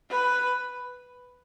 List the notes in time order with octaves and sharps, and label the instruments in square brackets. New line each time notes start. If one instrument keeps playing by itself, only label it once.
[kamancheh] B4